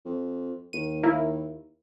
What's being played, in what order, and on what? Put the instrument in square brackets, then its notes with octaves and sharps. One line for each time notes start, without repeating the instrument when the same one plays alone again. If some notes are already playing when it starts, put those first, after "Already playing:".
[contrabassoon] F2
[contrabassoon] D#2 [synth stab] D#7
[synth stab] A#3 E4 A#4